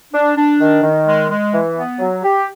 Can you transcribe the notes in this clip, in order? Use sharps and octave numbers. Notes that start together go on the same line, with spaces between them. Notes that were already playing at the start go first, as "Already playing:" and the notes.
D4
D4
D#3
D#3
G#3
G#3
E3
B3
F#3
G4